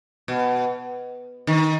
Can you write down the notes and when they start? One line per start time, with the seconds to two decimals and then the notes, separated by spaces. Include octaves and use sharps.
0.28 B2
1.47 D#3